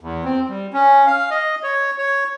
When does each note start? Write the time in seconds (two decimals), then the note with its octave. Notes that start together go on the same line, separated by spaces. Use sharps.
0.01 E2
0.24 C4
0.49 G3
0.73 C#4
1.07 F5
1.31 D#5
1.63 C#5
1.98 C#5